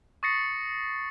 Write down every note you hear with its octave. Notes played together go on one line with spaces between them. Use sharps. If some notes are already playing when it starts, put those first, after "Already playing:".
C#6 D#6 A6 A#6 C7 C#7